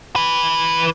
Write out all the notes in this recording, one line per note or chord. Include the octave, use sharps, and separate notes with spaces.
E3 B4